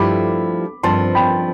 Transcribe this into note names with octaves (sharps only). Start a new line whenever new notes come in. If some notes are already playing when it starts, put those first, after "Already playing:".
Already playing: G2 F3 A3 E4 G4 B5 D6
G2 F3 C4 A5 C6
G5 B5